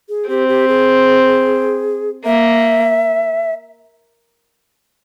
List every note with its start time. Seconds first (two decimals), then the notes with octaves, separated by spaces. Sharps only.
0.09 G#4
0.28 C4 G4
0.48 G4
0.68 G#4
2.25 A#3 E5